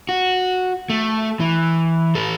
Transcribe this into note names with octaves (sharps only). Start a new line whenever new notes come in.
F#4
A3
E3
A4 B4